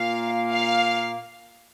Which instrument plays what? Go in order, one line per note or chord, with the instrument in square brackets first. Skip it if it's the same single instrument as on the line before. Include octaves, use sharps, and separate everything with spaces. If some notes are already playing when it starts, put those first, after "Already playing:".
Already playing: [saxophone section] A#2 A#3 F4 [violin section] F5
[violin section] F5